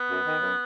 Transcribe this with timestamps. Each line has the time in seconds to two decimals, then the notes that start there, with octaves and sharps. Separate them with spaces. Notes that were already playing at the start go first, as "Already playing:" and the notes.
Already playing: B3
0.09 F#2
0.25 D#3
0.41 F#2